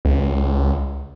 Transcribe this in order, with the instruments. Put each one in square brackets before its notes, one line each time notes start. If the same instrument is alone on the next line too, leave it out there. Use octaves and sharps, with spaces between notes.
[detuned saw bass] C#2